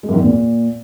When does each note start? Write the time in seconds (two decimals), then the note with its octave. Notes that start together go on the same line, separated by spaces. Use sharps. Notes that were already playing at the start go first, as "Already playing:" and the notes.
0.03 G#3
0.08 F#2
0.14 D#3
0.19 E2
0.24 A#2